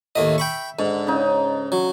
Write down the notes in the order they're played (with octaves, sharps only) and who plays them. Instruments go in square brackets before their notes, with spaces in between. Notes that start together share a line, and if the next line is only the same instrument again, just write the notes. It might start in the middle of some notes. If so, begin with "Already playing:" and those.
[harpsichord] D#2 A2 D#5 [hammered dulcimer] E5
[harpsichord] G5 B5 C#6
[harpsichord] G#2 [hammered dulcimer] D3
[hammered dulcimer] C#3 D#4
[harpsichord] F#3